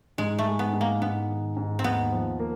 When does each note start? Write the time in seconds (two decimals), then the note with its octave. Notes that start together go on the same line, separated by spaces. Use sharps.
0.18 G#2 G#3
0.39 A3
0.46 G#3
0.59 B3
0.73 G#2
0.81 A#3
1.02 G#2 B3
1.29 D#3
1.57 G#2
1.79 C4
1.84 D#2 B3
2.12 F3
2.39 A#3